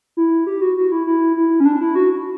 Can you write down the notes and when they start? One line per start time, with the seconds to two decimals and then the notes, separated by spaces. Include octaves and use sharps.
0.17 E4
0.46 G4
0.61 F#4
0.77 F#4
0.92 E4
1.07 E4
1.36 E4
1.60 C#4
1.65 D4
1.81 E4
1.95 F#4